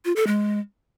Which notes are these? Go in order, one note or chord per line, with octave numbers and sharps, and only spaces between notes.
F4
A4
G#3